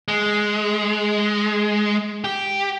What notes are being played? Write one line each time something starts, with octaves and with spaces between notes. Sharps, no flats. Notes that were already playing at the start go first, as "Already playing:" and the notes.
G#3
G4